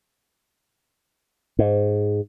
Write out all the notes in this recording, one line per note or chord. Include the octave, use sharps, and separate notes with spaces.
G#2